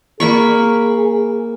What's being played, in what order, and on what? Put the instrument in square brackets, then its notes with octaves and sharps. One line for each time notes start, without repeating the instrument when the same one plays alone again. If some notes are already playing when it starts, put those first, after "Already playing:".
[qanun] A#3 B5 C#6 [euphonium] G#4